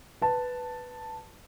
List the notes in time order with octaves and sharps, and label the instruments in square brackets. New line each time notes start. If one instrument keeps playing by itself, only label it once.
[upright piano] B4 A5